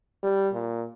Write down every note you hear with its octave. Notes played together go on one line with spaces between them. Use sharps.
G3
A#2